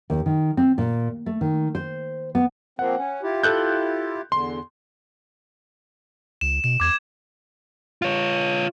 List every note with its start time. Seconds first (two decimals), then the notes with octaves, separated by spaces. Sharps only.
0.10 D#2
0.26 D#3
0.57 C4
0.78 A#2
1.26 A3
1.41 D#3
1.75 C5
2.35 B3
2.79 F3 A#3 C4 F#5
2.97 C#4
3.23 E4 F4 G4
3.43 A4 F#6 G6
4.32 E2 D3 C6
6.41 C#2 E7
6.64 B2 E7
6.80 E2 D6 G#6 E7
8.02 F4 C#5